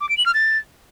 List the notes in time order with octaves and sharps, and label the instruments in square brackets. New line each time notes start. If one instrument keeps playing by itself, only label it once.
[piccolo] D6
D7
F#7
F6
A6